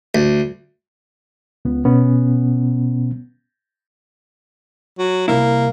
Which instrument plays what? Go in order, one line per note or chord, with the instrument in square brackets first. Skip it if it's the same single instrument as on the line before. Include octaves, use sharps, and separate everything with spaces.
[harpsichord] D2
[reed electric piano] C#2 B3
B2 B3 C#4
[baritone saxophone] F#3
[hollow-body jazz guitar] C2 F#2 E4 [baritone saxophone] A#3